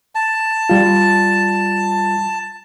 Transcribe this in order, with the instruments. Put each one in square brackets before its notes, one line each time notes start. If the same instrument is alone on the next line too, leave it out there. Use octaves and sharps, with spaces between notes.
[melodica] A5
[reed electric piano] G3 F4